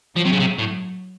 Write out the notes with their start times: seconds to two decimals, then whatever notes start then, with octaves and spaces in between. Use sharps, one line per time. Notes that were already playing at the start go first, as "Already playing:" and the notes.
0.16 F3 F#3
0.25 C3
0.32 C#3
0.40 C3
0.59 A2